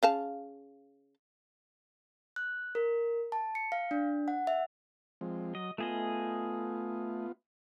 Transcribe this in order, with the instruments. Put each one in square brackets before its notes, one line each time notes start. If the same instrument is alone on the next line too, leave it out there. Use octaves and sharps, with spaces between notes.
[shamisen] C#3 F5 A5
[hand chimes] F#6
A#4
A5
C#7
F5
D4
F#5
E5
[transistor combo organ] F3 G#3 C4
[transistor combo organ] F#3 [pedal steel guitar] D#5
[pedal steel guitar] A3 G#4 D#5 [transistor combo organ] B3 F4